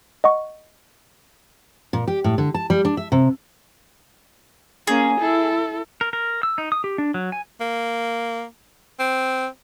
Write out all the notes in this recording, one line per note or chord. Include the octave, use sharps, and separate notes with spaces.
D#5 F#5 C#6
A#2
G4
A2
D3
A5
G3
D4
E5
C3
A#3 C#4 G#4
E4 A4
A#4
A#4
E6
D#4
D#6
G4
D4
F#3
G#5
A#3
C4